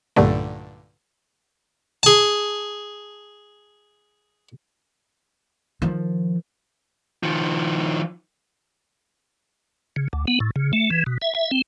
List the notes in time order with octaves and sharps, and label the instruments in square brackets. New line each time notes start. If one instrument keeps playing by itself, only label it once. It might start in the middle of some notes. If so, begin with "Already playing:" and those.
[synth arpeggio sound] B1 G2 A#2 D3 A3
[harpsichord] G#4 A5
[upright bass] D#3 F3
[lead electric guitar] D#3 F3
[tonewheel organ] C#3
D2
B3
A2
C#3
A3
E3
B2
E5
E5
C4